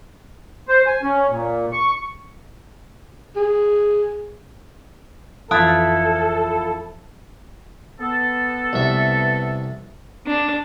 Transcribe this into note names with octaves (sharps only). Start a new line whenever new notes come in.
C5
G#5
C#4
A#2
C#6
G#4
F2 E3 E4 F4 A4 A5 D#6 F#6
B3 A4
C2 E5
D4